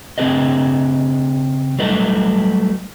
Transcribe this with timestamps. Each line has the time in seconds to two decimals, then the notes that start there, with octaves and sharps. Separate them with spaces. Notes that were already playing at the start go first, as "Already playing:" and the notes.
0.18 C#3 C4 D4 G#4 B4 D#5
1.79 F#3 G3 A3 B4 D#5